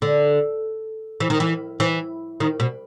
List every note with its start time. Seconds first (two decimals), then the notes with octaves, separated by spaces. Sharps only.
0.02 D3
1.20 E3
1.30 D#3
1.40 E3
1.80 E3
2.40 D#3
2.60 B2